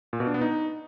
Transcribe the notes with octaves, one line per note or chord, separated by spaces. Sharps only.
A#2
B2
D4
B3
D#4